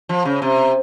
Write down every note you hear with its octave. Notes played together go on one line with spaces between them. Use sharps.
F3
C#3
C3